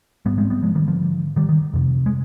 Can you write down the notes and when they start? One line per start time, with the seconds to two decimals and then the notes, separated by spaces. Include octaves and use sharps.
0.26 G#2 G3 B3
0.38 G#3 C4
0.50 G3 B3
0.63 F3 G#3
0.75 D#3 G3
0.87 D3 F3
1.36 D#3 G3
1.49 D#3
1.73 F2 C3
2.06 G#3